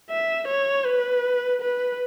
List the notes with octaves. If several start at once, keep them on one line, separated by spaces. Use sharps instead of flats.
E5
C#5
B4
B4